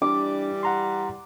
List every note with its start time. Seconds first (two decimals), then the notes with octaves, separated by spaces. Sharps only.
0.02 E3 G3 D4 D6
0.63 F#5 A#5 C6